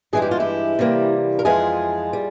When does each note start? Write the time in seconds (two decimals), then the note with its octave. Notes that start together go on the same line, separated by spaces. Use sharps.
0.13 G2 E3 G#3 G#4
0.22 G4
0.31 F4
0.40 E4 G4
0.79 C3 E3 G3 A#3
1.39 A#4
1.45 F2 E3 G#3 F4 G#4
2.13 G3